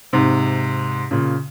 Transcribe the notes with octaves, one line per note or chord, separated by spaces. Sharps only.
G#2 C3
A#2 C#3